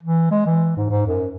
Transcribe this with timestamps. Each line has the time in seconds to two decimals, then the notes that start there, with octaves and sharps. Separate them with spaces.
0.03 E3
0.31 G#3
0.46 E3
0.77 G#2
0.90 G#2
1.06 F#2